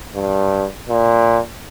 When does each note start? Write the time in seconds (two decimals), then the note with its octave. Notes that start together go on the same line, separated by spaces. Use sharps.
0.16 G2
0.89 A#2